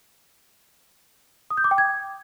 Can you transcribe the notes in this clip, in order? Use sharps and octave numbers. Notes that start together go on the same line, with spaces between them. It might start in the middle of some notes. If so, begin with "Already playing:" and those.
D#6
G6
D6
G5
G#6